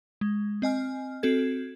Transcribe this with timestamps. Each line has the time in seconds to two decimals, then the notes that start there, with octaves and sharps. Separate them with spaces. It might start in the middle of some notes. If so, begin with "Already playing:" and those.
0.21 G#3
0.62 C4 D#5 G#5 F6
1.23 C4 F#4 A4 G#6